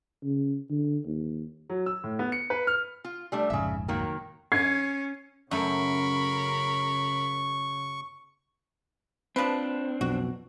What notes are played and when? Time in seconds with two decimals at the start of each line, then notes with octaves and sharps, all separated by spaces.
0.24 C#3
0.70 D3
1.06 D#2
1.70 F#3
1.86 E6
2.04 A2
2.19 B3
2.32 C#7
2.50 B4
2.67 F6
3.04 F4
3.32 G3 A3 D4
3.50 F1 A#1 G#2 C#3 E5
3.88 D#3 F#3 A#3
4.52 C#4 G#6 C7
5.51 F#2 C#3 A3 A#4 B5 C#6
9.36 F3 C4 D4 B4
10.01 B1 F2 B2 F#4